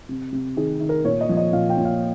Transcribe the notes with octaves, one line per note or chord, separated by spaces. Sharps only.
C3
C3
D#3 G#4
D#3
A#4
A#2 C#5
D#5
F3
D#5
A#2 F5
G5
A#2
F5